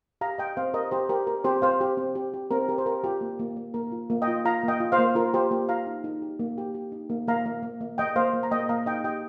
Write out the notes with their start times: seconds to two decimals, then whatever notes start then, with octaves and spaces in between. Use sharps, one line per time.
0.21 G4 F5 A#5
0.38 G4 D#5 G5
0.57 C4 C5 F5
0.74 G4 A#4 D#5
0.91 C4 G4 C5
1.09 G4 A#4
1.27 G4 A#4
1.44 C4 G4 C5
1.62 C4 C5 F5
1.81 G4
1.97 C4
2.15 G4
2.34 G4
2.51 C4 A#4
2.68 G4 A#4
2.78 C5
2.86 G4 A#4
3.04 F4 G4
3.21 A#3
3.39 A#3
3.56 A#3
3.74 A#3 A#4
3.92 F4
4.10 A#3
4.22 D#5 G5
4.28 F4
4.45 F4 F5 A#5
4.63 A#3 D#5 G5
4.80 F4
4.92 C5 F5
4.99 A#3
5.15 F4 A#4
5.34 F4 G4 C5
5.51 A#3 G4
5.69 F4 F5 A#5
5.87 D#4
6.04 D#4
6.22 G4
6.39 A#3
6.58 G4
6.75 G4
6.92 D#4
7.10 A#3
7.28 A#3 F5 A#5
7.46 A#3
7.63 A#3
7.81 A#3
7.98 A#3 D#5 G5
8.16 A#3 C5 F5
8.33 A#3
8.43 A#5
8.51 A#3 D#5 G5
8.69 A#3 F5 A#5
8.86 D#4 D#5 G5
9.04 G4 D#5 G5